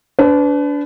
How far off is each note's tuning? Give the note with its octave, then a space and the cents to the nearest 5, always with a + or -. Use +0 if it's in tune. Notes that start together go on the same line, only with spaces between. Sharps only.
D4 -25 B4 +30